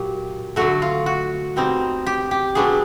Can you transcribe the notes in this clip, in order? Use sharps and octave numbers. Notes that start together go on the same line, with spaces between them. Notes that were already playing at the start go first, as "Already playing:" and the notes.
Already playing: A#2 F#3 G4
D3 F#3 A3 F#4
F4
F#4
B2 G3 C4 D#4
G4
G4
B2 F#3 B3 D4 G#4